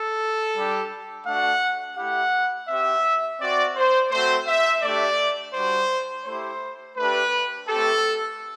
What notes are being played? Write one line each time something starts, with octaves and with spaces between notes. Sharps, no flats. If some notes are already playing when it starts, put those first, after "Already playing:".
Already playing: A4
G3 D4 G4
A3 D4 F#4 F#5
A3 E4 G4 F#5
C4 G4 E5
C4 F#4 D5
C5
A3 C4 F#4 C5
E5
A3 D4 G4 D5
G3 D4 F#4 C5
A3 E4 G4 C5
A3 D4 G4 B4
A3 C4 G4 A4